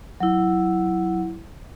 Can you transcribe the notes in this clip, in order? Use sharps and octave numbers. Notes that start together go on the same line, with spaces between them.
F#3 E4